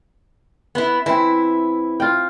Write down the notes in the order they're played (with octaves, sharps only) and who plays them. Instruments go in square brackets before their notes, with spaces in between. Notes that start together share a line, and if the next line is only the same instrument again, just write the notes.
[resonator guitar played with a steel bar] B3 E4
[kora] E3 C4 [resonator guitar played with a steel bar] E4
[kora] F4 G5